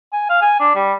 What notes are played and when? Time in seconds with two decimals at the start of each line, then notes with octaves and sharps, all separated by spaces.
0.13 G#5
0.30 F5
0.41 G#5
0.60 D4
0.75 G3